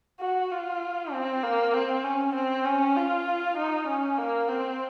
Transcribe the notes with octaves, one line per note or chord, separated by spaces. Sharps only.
F#4
F4
C4
A#3
C4
C#4
C4
C#4
F4
D#4
C#4
A#3
C4